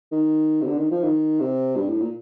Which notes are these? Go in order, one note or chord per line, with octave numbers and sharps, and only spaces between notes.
D#3
C3
D3
D#3
F3
D#3
C3
G2
A2
A#2